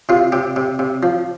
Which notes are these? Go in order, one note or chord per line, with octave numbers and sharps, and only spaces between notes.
C3 F4
C3 G4
C3
C3
F3